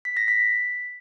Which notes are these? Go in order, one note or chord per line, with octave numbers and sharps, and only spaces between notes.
B6
A#6
B6